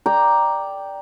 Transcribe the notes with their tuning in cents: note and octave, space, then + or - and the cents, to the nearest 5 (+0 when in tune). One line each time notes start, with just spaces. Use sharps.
D5 +0 G5 +0 A#5 +5